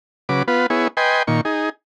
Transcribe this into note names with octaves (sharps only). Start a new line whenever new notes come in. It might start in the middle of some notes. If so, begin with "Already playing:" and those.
C#3 F#3 B4 D6
B3 F4 B4
B3 E4 G#4 C#5
B4 D#5 G5 G#5 C6
A#2 D#3 C#6
D#4 G#4